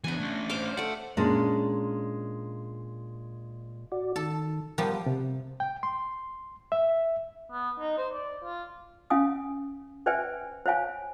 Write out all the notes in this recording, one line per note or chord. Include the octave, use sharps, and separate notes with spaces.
E3 B3 D4 G#5
A3 C#4
C5 F5 D6
A3 D5 F#5
A#2 G#3 C#4 D4
F#4 D5
D#3 A4
F3 G3 B3 A#4 G5
C3
G5
C6
E5
B3
D#4
C5
D5
F4
C#4 F5 G#5 D#6
B4 C5 D5 E5 G5 G#5
C5 C#5 F5 G#5